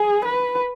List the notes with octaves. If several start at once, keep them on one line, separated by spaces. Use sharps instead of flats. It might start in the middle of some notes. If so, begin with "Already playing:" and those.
Already playing: G#4
B4